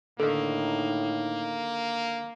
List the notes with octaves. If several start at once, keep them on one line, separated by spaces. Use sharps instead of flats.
A2 D3 D#3 A#3 D#4 A4